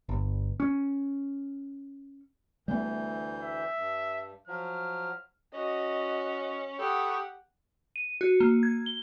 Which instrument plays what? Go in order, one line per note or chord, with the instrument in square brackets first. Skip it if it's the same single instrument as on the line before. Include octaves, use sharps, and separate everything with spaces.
[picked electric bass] G1
C#4
[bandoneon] D2 E3 G6 [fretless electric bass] G3 A3 B3
[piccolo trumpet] E5
[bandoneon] G2
[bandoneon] F3 F#3 [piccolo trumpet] F6
[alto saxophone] C#4 [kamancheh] F#4 D#5
[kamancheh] G4 F#5 [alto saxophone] A4 [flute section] B5 C#6 D#6
[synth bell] D#7
F#4
A#3
G#6
G7